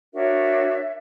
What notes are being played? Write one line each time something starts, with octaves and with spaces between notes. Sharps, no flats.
D4 F#4 A#4 C#5 E5